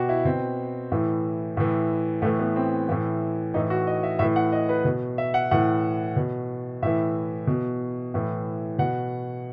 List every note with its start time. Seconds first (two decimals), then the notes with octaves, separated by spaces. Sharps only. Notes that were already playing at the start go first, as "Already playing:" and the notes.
Already playing: B2 F#4 G4
0.09 E4
0.25 B2 C4
0.92 A2 E3
1.57 A2 E3
2.22 A2 E3 A3
2.40 B3
2.56 C4
2.89 A2 E3
3.54 A2 E3 D#4
3.70 F#4
3.87 D#5
4.03 E5
4.19 A2 E3 E5
4.36 F#5
4.52 D#5
4.69 B4
4.85 B2
5.18 E5
5.34 F#5
5.51 A2 E3 F#5
6.16 B2
6.82 A2 E3 E5
7.47 B2
8.14 A2 E3
8.79 B2 F#5